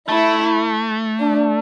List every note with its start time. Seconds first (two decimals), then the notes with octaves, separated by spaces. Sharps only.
0.09 A3 E4
1.19 D4